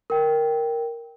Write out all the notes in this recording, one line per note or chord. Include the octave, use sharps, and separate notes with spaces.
A#4 G5